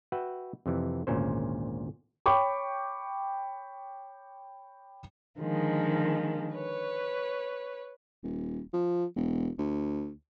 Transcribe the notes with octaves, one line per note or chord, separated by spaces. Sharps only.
F#4 B4 E5 F#5 G5
F2 C3 E3
G#1 D2 A#2 C#4 C5
C#5 G5 B5 C#6 D6
D3 D#3 F3 G#3 A#3
B4 C#5
D#1
F3
E1
D2